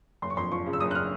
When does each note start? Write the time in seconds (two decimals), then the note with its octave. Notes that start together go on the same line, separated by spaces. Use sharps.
0.22 F#1 C6
0.30 C#6
0.37 F2 C6
0.52 F3 C#6
0.66 C#3
0.73 E6
0.80 F#1 D#6
0.91 F#6
0.95 F6